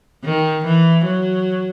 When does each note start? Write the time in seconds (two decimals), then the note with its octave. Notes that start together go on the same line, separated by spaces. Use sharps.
0.24 D#3
0.65 E3
1.06 F#3